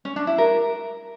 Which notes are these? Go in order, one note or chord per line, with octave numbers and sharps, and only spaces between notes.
C#4
D4
E4
A#4